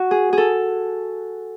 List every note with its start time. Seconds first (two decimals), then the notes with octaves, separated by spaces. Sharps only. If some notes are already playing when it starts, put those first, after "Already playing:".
Already playing: F#4
0.11 G#4
0.33 G#4 A4